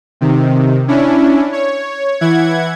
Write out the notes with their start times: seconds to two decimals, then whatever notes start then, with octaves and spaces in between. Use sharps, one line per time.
0.21 C3 D#3
0.88 C#4 D4 E4
1.52 C#5
2.21 E3 E4 F#5 G#6